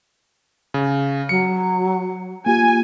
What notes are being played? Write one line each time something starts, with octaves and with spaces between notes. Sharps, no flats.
C#3
F#3 C#7
A#3 F4 G4 G#5